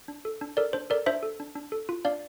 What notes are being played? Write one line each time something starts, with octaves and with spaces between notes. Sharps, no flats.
D4
A4
D4
A4 A#4 D5
D4 C5
A4 A#4 D5
D4 C5 E5
A4
D4
D4
A4
F4
D4 D5 F5